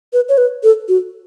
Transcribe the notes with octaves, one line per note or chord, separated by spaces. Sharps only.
B4
C#5
B4
A4
F#4